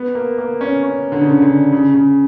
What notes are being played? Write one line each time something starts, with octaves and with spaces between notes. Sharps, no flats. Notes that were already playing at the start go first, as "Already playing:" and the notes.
Already playing: B3
A#3
A#3
C#4
C#4
D3
C#3
D3
D3
C#3
C#3